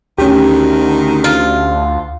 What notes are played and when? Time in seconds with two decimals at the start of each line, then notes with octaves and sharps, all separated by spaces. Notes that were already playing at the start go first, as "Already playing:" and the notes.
0.18 D2 D#3 C#4 G4
1.24 F4